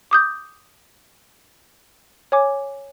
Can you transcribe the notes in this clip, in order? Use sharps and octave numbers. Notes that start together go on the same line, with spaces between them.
D6 D#6 G6
C#5 G#5 D6